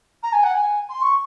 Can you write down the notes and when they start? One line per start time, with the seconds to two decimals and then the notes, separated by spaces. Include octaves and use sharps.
0.23 A#5
0.32 G#5
0.43 F#5
0.54 G#5
0.89 C6
1.02 C#6